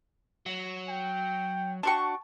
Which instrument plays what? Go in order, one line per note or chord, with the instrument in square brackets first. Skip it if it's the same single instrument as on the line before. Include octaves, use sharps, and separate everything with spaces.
[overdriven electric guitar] F#3
[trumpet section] G5
[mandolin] D4 F#4 C#6 [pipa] G5 A5